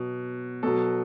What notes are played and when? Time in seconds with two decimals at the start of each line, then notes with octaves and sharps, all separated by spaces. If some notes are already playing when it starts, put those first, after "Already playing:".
Already playing: B2 F#3
0.63 B2 F#3 A4